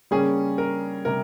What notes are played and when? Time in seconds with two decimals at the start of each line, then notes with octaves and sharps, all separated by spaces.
0.11 C#3 G3 A#3 C#4 G#4
0.58 A#4
1.05 C3 G3 A#4